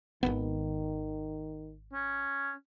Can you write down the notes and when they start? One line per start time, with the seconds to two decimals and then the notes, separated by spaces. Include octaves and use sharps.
0.23 G#1 D#2 D#3 B3
1.93 C#4